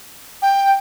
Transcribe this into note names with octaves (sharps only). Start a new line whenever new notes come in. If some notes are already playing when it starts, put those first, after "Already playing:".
G5